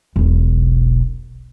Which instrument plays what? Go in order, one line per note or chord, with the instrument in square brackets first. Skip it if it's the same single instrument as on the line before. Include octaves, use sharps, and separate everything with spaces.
[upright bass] E1 B1